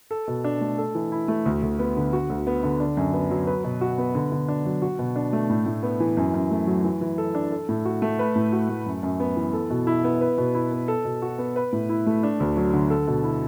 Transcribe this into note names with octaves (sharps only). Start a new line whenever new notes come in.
A4
B2
D4
A3
A4
E3
E4
A3
D2
D2
B3
D3
F#4
D2
B3
D3
D4
F#2
B3
F#3
B4
B2
F#4
B3
D3
D3
D4
F#3
F#4
B2
D4
A3
A2
A2
B3
E3
F#2
F#2
A3
F#3
E3
E3
A4
D4
A4
A2
F#4
A3
B4
A2
F#4
A3
F#2
F#2
B3
E3
A4
B2
E4
B3
B4
B2
E4
B3
A4
B2
F#4
B3
B4
A2
E4
A3
D4
D2
F#3
D3
A4
B2
E4